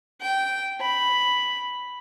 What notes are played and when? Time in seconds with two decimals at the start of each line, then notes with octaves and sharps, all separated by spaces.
0.21 G5
0.81 B5